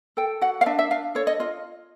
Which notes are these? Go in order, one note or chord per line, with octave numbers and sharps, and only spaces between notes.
A4 G5
F#4 F#5
F5
D4 E5
E5
D4 F5
A4 C#5
D#5
F4 D#5